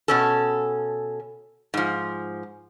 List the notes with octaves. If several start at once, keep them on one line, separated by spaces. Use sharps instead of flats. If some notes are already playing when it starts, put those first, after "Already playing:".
B2 C#4 A4
G#2 F3